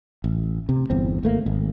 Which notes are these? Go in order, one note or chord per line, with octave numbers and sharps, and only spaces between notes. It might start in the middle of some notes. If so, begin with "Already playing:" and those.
A1
C3
G1 E2 C4
G#1 A3 A#3
G#1